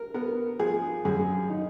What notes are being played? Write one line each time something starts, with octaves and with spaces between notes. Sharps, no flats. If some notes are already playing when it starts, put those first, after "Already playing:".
Already playing: A#4
B3 A#4
F3 G#4
F#2 G#4
D#4